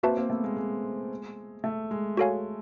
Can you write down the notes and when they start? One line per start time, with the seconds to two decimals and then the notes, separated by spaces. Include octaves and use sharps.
0.03 A#3 C4 F#4 B4 E5 A5
0.17 A#3 C4
0.30 A3 B3
0.44 G#3 A#3
0.57 G#3
1.64 A3
1.91 G#3
2.17 F#4 A4 C#5 F5 G#5